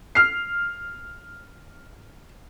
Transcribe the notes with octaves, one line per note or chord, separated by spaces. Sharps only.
F6 C7